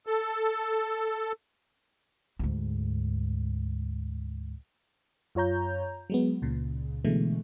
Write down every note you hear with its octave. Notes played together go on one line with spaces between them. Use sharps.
A4
D2 G#2
F#2 F4 C#5 A#5 G6
F#3 G#3 B3
C#2 A#2 C#3
B2 D3 E3 G#3 A3